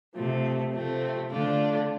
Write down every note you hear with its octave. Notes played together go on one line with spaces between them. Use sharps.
C3 F3 A3
C3 F3 A3 C4
D3 A3 D4 F4